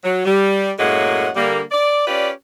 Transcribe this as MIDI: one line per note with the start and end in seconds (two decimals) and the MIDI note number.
0.04 0.25 54
0.25 0.71 55
0.79 1.29 42
0.79 1.29 45
0.79 1.29 56
0.79 1.29 58
0.79 1.29 73
0.79 1.29 78
1.36 1.61 50
1.36 1.61 55
1.36 1.61 58
1.71 2.05 74
2.07 2.31 61
2.07 2.31 65
2.07 2.31 67
2.07 2.31 71
2.07 2.31 74